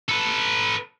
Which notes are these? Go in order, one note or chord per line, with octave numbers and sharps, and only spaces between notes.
A4 B4